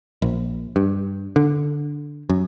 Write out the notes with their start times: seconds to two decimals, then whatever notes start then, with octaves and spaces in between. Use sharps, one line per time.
0.22 A#1
0.76 G2
1.36 D3
2.30 F#2